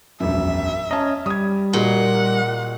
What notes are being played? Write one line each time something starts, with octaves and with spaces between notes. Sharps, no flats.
E1 A#1 F#2 E5
C#4 D#5 A5 A#5
G3 D#6 G#6
A#2 D#4 F#4 G#4 F#5